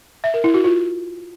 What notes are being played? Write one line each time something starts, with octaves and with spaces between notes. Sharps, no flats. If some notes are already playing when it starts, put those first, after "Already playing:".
E5
A#4
E4
F#4
F4